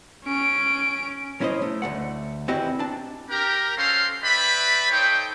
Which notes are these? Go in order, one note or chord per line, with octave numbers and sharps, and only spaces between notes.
C#4 D7
F#3 C#4 E4 C5 D#5
A3
D2 A3 F#5
E2 C4 E4 F#4 G4 D#5
D4 A5
G4 A#4 A#5
C#4 F#4 A4 C5 F5 C6
B4 D5 E5 G5 B5
D#4 A4 C5 C#5 G5